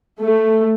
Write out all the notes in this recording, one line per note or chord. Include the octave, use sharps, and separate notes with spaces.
A3